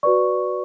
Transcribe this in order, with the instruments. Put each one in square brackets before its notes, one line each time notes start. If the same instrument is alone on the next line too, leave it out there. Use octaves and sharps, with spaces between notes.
[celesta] F#4 B4 D5 C#6